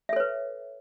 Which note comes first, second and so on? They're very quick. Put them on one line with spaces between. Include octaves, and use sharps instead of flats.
E5 A4 C#5 B4